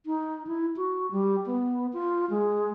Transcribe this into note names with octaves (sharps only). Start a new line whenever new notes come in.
D#4
E4
F#4
G3
B3
F4
G#3